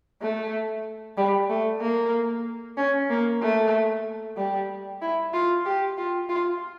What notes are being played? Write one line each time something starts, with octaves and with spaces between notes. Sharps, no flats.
A3
G3
A3
A#3
C#4
A#3
A3
G3
E4
F4
G4
F4
F4